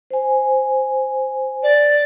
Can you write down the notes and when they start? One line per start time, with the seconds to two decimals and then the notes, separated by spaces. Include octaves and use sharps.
0.10 C5 G#5
1.63 D5